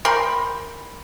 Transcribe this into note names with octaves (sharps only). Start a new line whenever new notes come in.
A#4 G5 B5 C6